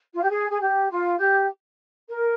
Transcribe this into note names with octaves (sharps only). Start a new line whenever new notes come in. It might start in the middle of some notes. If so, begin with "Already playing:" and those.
F4
G4
G#4
G#4
G4
F4
G4
A#4